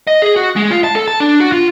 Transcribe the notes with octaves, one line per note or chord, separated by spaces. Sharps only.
D#5
G#4
F#4
G#3
F4
A5
A4
A5
D4
F#4
F4